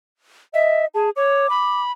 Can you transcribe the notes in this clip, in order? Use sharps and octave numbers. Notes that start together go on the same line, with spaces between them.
D#5 E5
G#4 A5
C#5 D6
B5